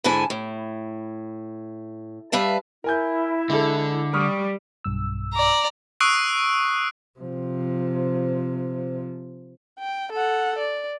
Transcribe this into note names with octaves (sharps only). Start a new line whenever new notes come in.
G#2 D3 E4 G#5 A5
A2
G3 B4 E5 F5 A5
E4 A#4 G#5 G6
D3 G#3 A4
G3 C#6 D#6 F6
B1 G2 E6
D5 A#5
C#6 D#6 E6 F#6 C7 D7
C3 F3
G5
A4 F#5
D5